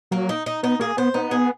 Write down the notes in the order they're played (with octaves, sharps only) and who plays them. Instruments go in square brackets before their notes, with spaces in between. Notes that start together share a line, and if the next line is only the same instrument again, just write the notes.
[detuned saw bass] F#3 [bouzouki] A#3
[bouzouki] D#4
D#4
[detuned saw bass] B3 [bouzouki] D#4
[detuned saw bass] A#3 [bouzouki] G#4
[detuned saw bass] B3 [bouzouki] C5
[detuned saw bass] B3 [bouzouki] D#4
[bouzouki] G#4